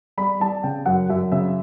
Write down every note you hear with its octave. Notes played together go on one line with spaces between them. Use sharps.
G3 B5
G3 A5
C#3 G5
F#2 F#5
F#2 E5
C#3 E5